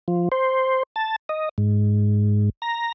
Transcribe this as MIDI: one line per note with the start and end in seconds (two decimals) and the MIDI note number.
0.08 0.29 53
0.32 0.83 72
0.96 1.16 81
1.29 1.49 75
1.58 2.50 44
2.62 2.92 82